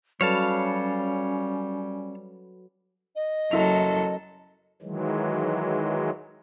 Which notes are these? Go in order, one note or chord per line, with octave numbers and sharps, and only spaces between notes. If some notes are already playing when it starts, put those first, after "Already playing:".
F#3 G3 C#4 A4 B4 C#5 F5 A5
D#5
F#1 F#3 E4 A4 F7
D#3 E3 F#3 G#3